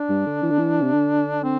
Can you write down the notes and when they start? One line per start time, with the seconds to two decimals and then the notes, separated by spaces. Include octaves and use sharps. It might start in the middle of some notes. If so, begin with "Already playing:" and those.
Already playing: D4
0.09 G2
0.26 D3
0.43 E3
0.51 D3
0.59 E3
0.81 C3
0.93 D3
1.43 C4